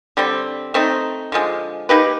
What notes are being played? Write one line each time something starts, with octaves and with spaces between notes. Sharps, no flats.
D3 G3 C4
A3 C4 D#4
D3 F3 G#3
A#3 D#4 G4 B4